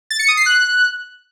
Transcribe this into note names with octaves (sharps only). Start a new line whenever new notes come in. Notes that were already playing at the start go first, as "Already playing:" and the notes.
A6
C#7
D#6
C7
F#6